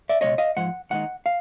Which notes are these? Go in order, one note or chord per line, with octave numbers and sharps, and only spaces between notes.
D5 E5
C#2 B2 G#3 C#5 D#5
D#5 F5
G#2 F3 G#3 F#5
D#2 D#3 G#3 D#4 F#5
F5